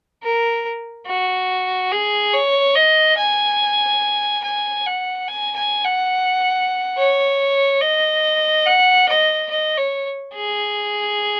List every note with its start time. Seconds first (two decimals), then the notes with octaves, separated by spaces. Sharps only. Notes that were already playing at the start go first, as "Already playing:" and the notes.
0.23 A#4
1.06 F#4
1.92 G#4
2.33 C#5
2.76 D#5
3.18 G#5
4.44 G#5
4.86 F#5
5.28 G#5
5.56 G#5
5.85 F#5
6.97 C#5
7.81 D#5
8.66 F#5
9.09 D#5
9.51 D#5
9.78 C#5
10.34 G#4